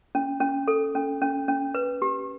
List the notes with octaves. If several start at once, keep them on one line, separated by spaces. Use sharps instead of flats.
C#4
C#4
A4
C#4
C#4
C#4
B4
G4